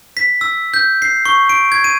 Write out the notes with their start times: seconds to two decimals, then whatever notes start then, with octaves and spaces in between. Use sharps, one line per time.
0.17 B6
0.41 E6
0.74 G6
1.02 C7
1.25 C#6
1.49 D7
1.72 G#6
1.84 D#7